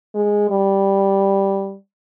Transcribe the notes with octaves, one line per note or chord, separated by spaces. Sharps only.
G#3
G3